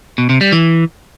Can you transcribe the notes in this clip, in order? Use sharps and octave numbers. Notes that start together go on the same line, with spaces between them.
B2
C3
G3
E3